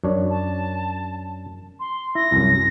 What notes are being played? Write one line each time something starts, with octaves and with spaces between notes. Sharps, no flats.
F#2 D4 C#5
A5
C6
E4 A#6
C2 F#2